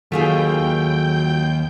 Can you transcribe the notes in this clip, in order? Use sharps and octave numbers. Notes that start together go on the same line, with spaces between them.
D#2 F#3 A3 F4 G#4 G5 G6